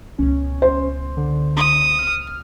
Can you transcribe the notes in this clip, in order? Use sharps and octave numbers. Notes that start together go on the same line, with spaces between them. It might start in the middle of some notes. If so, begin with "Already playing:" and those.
C#2 B2 C#4
C5
D3
D#6
F6